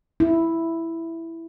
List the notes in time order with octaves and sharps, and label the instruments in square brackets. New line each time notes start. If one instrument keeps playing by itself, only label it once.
[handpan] E4